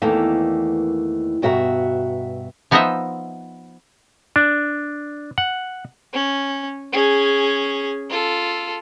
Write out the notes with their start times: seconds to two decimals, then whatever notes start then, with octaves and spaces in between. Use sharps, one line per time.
0.02 E2 D#3 E3 A3 A#3
1.42 G2 B2 F#4 E5 A#5
2.71 F3 B3 D#4 C5 D#5 E5
4.36 D4
5.38 F#5
6.13 C#4
6.92 C#4 G#4
8.10 F4 A4